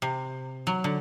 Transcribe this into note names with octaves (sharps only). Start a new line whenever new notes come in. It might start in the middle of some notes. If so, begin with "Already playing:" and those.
C3
F#3
D3